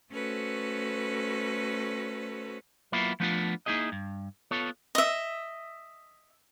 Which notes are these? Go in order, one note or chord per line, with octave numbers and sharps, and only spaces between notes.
A3 C#4 F#4 A4 B4 C5
F#3 A#3 B3 E4 F4
F3 A3 B3 D4 D#4 F4
A#3 D#4 E4 G#4 D#5
G2
B3 F4 A4 C#5
D#5 E5